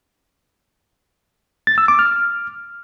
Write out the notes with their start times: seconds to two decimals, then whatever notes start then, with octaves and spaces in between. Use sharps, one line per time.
1.67 A6
1.78 E6
1.88 D6
1.99 F6